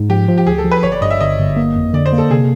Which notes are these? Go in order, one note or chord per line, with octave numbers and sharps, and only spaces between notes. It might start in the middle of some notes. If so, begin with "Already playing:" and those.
Already playing: G#2
F3 G4
F3
G4
D2 G#4
A4
F3
B4
G1 C#5
D5
G2 D#5
E5
G1 D#5
G1
A#3
F2
D3 D5
C5
A#3
A4
C3 G#4